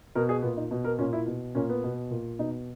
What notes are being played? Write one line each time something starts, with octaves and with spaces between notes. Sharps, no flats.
B2 A#4
G#4
A#2 B3
D#4
B2
A#4
A#2 C#4
E4
B2
A#2 C#4
B3
B2
A#2
B2 D#4